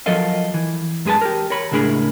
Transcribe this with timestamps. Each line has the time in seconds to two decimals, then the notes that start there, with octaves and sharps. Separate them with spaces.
0.06 F3 F#3 A4 A#4 D#5 F5
0.54 E3
1.05 F#2 G#3 G#4 B4 A5
1.22 G4 A#4
1.50 A#4 C#5 B5
1.72 C#2 A2 D4 G#4 A#4 B5